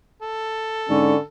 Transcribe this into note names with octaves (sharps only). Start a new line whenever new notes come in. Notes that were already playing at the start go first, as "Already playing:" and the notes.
A4
G#2 D3 C#4